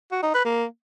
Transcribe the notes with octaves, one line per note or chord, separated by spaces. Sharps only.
F#4
D#4
B4
A#3